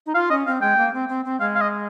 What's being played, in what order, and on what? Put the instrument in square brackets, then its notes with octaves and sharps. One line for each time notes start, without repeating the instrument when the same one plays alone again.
[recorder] D#4
[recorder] F4 [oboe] F5
[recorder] C#4 [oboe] D#5
[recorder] C4 [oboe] F5
[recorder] G#3 [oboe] G5
[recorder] A#3
C4
C4
C4
[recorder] G#3 [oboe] F5
[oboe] F5
D#5